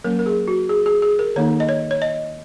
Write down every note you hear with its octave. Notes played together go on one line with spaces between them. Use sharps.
F#3 A#3 C#4 A#4
A#4
G#4
F#4
G#4
G#4
G#4
A#4
D#3 A#3 D#4 C#5
D#5
C#5
C#5
D#5